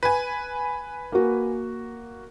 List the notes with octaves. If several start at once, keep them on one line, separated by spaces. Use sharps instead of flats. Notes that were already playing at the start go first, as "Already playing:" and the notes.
B4 G#5
A#3 F#4